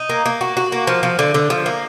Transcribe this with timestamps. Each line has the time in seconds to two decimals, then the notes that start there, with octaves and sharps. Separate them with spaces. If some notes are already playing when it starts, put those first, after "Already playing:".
Already playing: D#4
0.09 A#3
0.26 A#3
0.41 F#4
0.57 F#4
0.72 A#3
0.87 F3
1.03 F3
1.19 D3
1.34 D3
1.50 F3
1.66 A#3